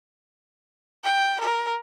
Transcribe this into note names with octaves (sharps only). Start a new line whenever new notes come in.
G5
A#4